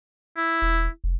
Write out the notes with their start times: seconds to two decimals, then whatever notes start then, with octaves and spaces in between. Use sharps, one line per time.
0.37 E4
0.62 E1
1.04 F1